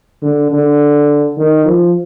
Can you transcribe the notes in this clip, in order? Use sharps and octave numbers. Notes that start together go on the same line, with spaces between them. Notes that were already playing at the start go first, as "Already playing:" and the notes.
D3
D3
D#3
F3